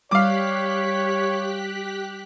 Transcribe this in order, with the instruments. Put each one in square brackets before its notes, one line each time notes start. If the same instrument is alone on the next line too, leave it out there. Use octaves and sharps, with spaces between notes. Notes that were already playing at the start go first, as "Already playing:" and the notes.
[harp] G3 [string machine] G4 F#6 B6 [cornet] C#5 [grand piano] F5 D6